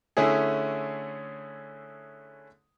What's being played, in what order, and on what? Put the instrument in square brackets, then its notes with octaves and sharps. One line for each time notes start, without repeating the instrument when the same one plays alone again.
[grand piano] D3 A3 C#4 E4 G#4